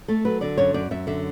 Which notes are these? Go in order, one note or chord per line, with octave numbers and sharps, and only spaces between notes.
A3 A4
F#3 B4
D3 D5
F#2 C#5
F#2 D5
F#2 E5
D3 E5